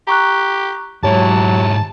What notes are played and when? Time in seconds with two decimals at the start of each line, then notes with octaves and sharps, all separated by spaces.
0.07 G4 A#5 C#6 F#6
1.04 G#2 F#3 E4 G4 C#5 A5